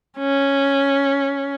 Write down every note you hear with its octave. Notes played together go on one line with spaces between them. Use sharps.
C#4